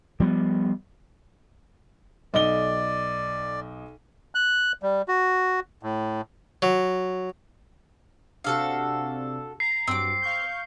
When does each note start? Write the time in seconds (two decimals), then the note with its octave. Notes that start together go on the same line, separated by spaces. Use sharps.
0.20 F3 G3 A#3 B3
2.34 B1 D5 D#5 G7
4.35 F#6
4.83 G3
5.08 F#4
5.83 A2
6.62 F#3
8.44 C3 D4 F#4 A4 F5
9.60 A#5 C7
9.87 G2 F#3 C4 D6
10.22 F5 C#6 G6